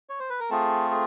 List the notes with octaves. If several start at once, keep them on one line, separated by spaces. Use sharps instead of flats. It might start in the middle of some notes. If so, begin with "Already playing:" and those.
C#5
C5
B4
A#4
A3 C4 F4 G#4 A4
G#4